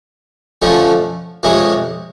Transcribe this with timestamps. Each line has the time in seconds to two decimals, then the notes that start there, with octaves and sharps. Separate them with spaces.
0.62 F2 D3 F3 A3 C#4
1.43 F2 C3 E3 G#3 C#4